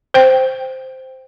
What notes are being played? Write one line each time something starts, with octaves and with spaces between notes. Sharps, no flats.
C5 G5